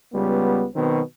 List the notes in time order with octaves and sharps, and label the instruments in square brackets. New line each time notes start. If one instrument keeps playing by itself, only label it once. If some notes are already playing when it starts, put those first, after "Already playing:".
[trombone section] C#2 G3 B3
B2 D#3 F#3 B3 C4